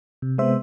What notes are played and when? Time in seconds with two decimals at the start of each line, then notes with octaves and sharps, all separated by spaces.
0.22 C3
0.38 G#3 C5 E5
0.42 B3